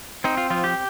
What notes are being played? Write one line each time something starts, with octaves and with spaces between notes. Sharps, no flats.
C4 D#4
F4
F3 F4
G4